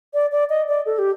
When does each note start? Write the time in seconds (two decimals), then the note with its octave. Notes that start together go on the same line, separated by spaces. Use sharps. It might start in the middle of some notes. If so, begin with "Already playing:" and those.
0.14 D5
0.32 D5
0.50 D#5
0.68 D5
0.86 A4
0.99 G4